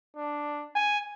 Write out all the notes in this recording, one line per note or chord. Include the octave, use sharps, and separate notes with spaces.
D4
G#5